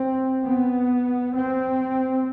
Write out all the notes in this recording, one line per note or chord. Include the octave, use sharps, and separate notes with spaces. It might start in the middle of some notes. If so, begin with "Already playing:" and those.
Already playing: C4
B3
C4